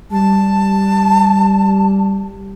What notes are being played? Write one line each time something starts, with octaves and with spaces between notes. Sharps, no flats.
G3 A5